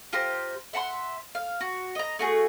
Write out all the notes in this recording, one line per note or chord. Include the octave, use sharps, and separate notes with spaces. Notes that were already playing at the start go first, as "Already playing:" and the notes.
F4 G4 C5 A#5
E5 F#5 A5 C6
F5
F#4
D#5 A#5
A3 F#4 G#4